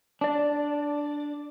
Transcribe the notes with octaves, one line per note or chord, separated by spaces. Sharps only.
D4 D5